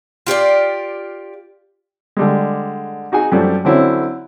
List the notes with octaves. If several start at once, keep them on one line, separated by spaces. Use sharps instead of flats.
F4 G4 C#5 D5
D3 G3 G#3
D#4 F#4 G#4 G#5
F#2 F3 G3 A3
D3 F#3 C4 C#4 E4